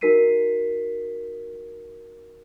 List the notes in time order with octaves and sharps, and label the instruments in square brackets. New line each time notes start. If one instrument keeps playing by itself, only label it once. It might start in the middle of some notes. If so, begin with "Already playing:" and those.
[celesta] D#4 F#4 A#4 B6 C7 D#7